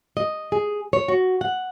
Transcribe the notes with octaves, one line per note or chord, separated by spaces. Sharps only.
D#5
G#4
C#5
F#4
F#5